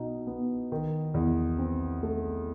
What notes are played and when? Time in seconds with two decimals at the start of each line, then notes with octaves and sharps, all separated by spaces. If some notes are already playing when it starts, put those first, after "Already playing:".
Already playing: B2 D#4
0.27 B3
0.72 D#3
1.14 E2
1.59 C4
2.03 A3